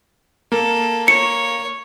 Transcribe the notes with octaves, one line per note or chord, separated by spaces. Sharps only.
A#3 A4
C#5 C#7